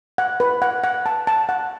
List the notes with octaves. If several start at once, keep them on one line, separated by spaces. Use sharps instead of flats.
F#5
B4
F#5
F#5
A5
A5
F#5